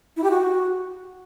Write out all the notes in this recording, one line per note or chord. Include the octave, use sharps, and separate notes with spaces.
E4
G4
F#4